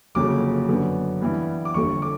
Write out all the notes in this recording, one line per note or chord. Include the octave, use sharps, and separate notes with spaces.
G1 F2 C#3 F#3 A#3 D6
F#2 D3 F#3 B3
G2 E3 G3 B3
D6
G1 F2 D3 C#6
D6